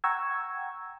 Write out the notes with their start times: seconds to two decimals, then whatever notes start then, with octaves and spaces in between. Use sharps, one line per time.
0.04 F#5 G5 A#5 C#6 E6 G#6